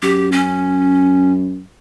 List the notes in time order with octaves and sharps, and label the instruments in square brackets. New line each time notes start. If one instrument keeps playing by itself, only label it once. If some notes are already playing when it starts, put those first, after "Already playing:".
[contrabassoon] F#2 [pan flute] G4
[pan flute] C#4